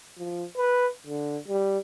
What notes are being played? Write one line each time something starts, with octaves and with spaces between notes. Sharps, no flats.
F3
B4
D3
G3